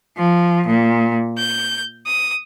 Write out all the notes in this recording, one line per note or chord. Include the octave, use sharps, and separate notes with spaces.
F3
A#2
G6
D#6